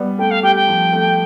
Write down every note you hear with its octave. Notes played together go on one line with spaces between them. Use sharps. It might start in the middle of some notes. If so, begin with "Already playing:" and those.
Already playing: G3 B3
A3 G5
F5
G4 G5
G5
F3
A3